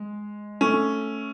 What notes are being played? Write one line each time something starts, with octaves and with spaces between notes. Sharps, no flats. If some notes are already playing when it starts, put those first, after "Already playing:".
Already playing: G#3
A3 C#4